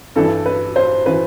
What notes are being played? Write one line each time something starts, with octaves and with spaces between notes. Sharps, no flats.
G2 E3 A4
B4
C5
E3 B4